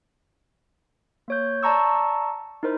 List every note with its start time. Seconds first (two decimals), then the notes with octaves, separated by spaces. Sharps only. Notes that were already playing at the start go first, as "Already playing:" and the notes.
1.28 A#3 C#5 G6
1.63 D5 A5 A#5 C#6 E6
2.63 D#4 E4 A#4 C5